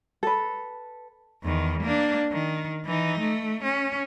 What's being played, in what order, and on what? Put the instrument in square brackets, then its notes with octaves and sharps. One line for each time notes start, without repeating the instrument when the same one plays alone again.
[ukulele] A4 B4
[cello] E2 D#3
A#3 D4
D#3
E3 D#4
A3
C#4